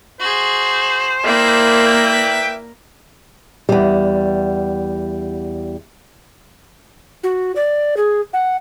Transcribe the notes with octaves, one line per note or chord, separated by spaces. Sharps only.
F#4 G#4 C5
A#3 E4 D5 E5 G5
B4
E2 G3
F#4
D5
G#4
F#5